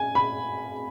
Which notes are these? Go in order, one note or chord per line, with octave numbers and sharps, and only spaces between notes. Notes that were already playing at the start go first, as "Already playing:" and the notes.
Already playing: G#5
B5